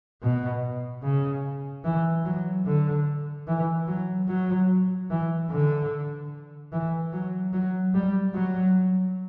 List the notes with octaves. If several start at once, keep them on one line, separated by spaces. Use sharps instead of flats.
B2
C#3
E3
F#3
D3
E3
F#3
F#3
E3
D3
E3
F#3
F#3
G3
F#3